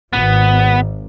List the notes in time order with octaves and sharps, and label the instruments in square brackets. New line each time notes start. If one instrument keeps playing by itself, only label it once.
[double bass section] G#1 [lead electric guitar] B3